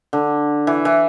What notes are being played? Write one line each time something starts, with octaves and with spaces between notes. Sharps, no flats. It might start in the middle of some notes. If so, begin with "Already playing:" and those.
D3
E3
E3